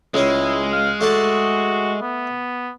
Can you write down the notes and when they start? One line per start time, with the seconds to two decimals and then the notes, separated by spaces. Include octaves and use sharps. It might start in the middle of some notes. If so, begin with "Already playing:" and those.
0.14 C#2 G#3 C#4 E4
0.72 F5
1.01 A3 F#4 D5 A5
2.01 B3